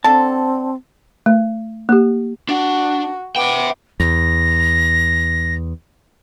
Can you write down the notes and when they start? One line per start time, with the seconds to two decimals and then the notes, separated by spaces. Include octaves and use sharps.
0.04 D3 C4 A4 A5
1.26 A3
1.89 A#3 G4
2.49 D4 F#4
3.36 B3 E5 G5 D6
4.00 E2 A#6